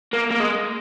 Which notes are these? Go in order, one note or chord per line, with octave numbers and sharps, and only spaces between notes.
A#3
A#3
G#3